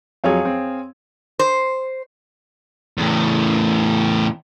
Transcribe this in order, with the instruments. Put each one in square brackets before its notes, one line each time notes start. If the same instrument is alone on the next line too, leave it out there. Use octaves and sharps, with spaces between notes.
[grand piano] F2 F3 F#3 [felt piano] G#4 C#5 F5
[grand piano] C4
[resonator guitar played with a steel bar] C5
[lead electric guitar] E2 A2